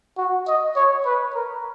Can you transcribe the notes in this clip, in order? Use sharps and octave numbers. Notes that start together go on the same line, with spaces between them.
F#4
D#5
C#5
B4
A#4